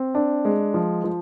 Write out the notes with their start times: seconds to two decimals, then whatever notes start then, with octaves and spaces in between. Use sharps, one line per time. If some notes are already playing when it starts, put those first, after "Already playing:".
Already playing: C4
0.15 D4
0.45 G#3
0.74 F3
1.04 F3